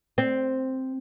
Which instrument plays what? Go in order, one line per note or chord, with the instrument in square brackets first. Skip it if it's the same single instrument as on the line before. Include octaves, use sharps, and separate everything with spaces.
[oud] C4